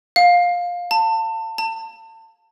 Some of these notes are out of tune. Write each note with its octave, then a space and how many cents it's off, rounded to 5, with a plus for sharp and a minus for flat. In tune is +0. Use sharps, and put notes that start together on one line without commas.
F5 +15
A5 +30
A5 +35